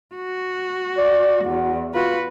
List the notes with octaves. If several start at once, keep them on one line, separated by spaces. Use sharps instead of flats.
F#4
D5
E2 F#4
F4 F#4 B4